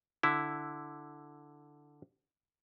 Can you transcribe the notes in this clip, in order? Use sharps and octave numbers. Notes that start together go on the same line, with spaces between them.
D3 E4